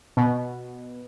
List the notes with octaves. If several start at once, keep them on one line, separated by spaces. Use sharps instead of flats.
B2